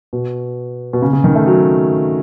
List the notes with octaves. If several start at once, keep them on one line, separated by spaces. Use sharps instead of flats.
B2
B2
C#3
C#3
D#3
A3
F#3